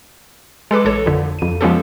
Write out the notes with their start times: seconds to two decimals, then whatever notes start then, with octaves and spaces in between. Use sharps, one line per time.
0.71 G#3 A4 B4 D6
0.85 A1 A4 C#5
1.06 F2 D3
1.39 F2 D#7
1.61 F3 G#3 B3 C#4 G4 A4